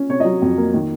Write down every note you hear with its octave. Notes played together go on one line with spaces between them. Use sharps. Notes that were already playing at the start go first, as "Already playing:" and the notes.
Already playing: C#4
C3 C#5
F#3 D#5
F2
A#3
D#3